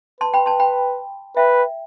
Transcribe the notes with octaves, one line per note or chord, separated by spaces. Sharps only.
B4 A5 C6
G5 B5
A5 C6
G5 B5
B4 E5 G5